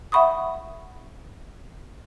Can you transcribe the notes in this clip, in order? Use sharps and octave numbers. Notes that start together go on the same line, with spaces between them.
E5 F#5 B5 C#6 D#6